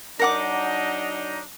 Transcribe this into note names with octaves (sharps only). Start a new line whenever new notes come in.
F#3 D4 D#4 A#4 F#5 D6